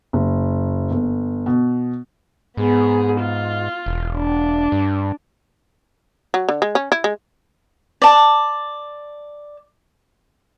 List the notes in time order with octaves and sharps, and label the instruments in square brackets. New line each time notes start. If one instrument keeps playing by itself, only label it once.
[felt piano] F#1
G1
B2
[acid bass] G#2 [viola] B3 G#4
[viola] F4
[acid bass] E1
[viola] D4
[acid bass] G2
[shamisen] F#3
D3
G#3
C#4
E4
G#3
[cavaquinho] D5 A5